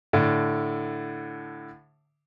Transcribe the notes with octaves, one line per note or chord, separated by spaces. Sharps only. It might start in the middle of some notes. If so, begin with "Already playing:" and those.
A2 D3